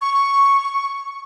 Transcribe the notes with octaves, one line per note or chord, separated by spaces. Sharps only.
C#6